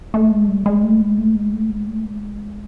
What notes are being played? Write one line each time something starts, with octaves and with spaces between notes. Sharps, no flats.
A3
G#3
G3
G#3
A3
G#3
A3
G#3
A3
G#3
A3
G#3